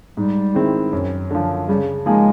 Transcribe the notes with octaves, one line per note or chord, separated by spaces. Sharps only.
G#2 G3
D#3 G#3 C4 E4
F#2
D3 F3
C#3 G3
F3 G#3 A#3 D#4 G#4